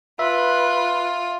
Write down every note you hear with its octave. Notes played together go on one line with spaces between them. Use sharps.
F4 B4 E5